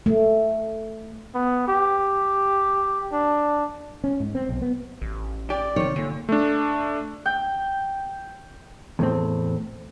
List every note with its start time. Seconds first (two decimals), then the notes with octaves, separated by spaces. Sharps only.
0.06 A3
1.34 B3
1.68 G4
3.12 D4
4.04 C#4
4.20 G#2
4.35 C4
4.49 B1
4.62 B3
5.02 A1
5.50 G4 D5
5.76 C3 D#3 C#5
5.96 A#2 D3
6.29 A3 D4
7.26 G5
8.99 E2 A2 C4